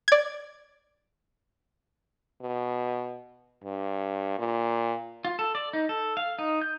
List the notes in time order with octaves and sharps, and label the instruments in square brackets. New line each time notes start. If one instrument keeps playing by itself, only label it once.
[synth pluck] D5 G#6
[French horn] B2
G2
A#2
[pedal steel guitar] F4
A4
D5
D#4
A4
F5
D#4
G6